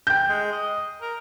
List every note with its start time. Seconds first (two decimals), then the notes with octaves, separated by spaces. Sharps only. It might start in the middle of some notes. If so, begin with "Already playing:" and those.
0.07 G5 G6
0.29 G#3
0.52 D#5
1.01 A#4